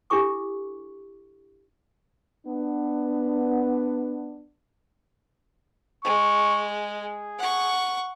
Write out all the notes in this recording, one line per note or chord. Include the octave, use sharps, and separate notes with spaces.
D4 E4 G4 A4 C#6 D6
B3 D4
G#3 C#6
G#4
F#5 C#6